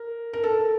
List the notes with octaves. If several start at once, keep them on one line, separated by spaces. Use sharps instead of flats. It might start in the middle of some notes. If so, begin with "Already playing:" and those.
Already playing: A#4
A#4
A4